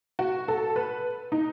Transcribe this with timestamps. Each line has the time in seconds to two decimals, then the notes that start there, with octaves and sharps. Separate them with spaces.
0.19 F#4
0.48 A4
0.76 B4
1.32 D#4